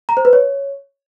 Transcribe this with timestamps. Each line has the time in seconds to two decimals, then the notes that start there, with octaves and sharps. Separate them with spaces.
0.09 A#5
0.17 C5
0.25 B4
0.33 C#5